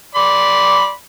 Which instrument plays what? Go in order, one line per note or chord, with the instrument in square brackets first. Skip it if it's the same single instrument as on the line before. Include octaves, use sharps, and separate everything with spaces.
[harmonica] D5 B5 C6